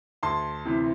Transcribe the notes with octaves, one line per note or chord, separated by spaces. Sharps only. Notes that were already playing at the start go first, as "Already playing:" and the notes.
D2 A5 C6
C3 E3